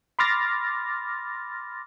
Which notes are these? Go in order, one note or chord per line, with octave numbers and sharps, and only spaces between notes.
B5 C6 D6 F6 A6 A#6